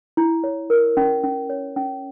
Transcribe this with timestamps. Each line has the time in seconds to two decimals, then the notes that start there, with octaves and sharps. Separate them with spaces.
0.17 E4
0.44 C#5
0.70 A#4
0.97 C#4
1.23 C#4
1.50 C#5
1.76 C#4